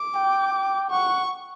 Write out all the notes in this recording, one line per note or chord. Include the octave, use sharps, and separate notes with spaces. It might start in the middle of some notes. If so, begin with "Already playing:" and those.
Already playing: D6
G5
G5
F#5 C#6